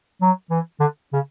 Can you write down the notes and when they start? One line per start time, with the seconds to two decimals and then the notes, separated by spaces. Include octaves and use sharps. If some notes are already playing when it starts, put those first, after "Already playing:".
0.22 F#3
0.50 E3
0.80 D3
1.13 C#3